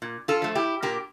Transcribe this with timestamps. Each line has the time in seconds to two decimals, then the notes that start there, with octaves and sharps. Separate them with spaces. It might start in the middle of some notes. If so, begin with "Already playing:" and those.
0.02 A#2
0.28 F4 A4
0.42 F3 A3
0.55 E4 G4
0.82 A#2 G4 A#4